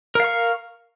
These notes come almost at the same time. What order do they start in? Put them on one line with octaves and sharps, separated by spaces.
A#4 F5 C#6